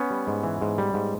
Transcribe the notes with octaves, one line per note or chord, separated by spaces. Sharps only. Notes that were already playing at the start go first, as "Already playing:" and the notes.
Already playing: B3 C#4
G3
G#2
E3
G#2
G3
G#2